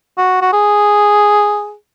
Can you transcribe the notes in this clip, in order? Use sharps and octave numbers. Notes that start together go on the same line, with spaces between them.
F#4
F#4
G#4